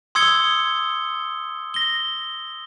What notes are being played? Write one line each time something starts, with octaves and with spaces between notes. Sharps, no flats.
C6 D#6 E6 G#6 C#7 G7
A#6 G7